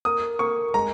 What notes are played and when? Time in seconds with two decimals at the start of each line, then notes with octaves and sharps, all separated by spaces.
0.05 A#3 D#6
0.39 A#3 C#6
0.74 G#3 A#5